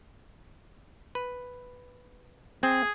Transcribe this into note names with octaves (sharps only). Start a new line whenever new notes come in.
B4
C4 G#4